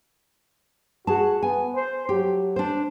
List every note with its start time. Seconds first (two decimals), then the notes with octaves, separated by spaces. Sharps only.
1.07 F#4 G#4 A5
1.43 B3 G#5
1.75 C5
2.09 F#3 G4
2.56 D4 C5